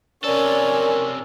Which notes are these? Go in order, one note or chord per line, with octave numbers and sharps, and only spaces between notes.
C3 C#4 A4 A#4 C#5 D5 G#5